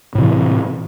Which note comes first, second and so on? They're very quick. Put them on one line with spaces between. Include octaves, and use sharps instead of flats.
A2 C3 E3